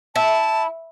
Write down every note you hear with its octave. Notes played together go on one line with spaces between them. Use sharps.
E4 A5